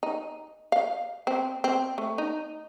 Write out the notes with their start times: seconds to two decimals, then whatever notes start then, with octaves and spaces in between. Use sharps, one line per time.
0.03 D#4
0.72 F5
1.27 C4
1.64 C4
1.98 A3
2.18 D#4